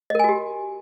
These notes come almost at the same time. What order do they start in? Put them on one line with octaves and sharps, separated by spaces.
D#5 A#4 G#5 F#4 G4